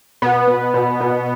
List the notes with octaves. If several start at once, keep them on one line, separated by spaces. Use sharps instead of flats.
B2 B3
B2
B2
B2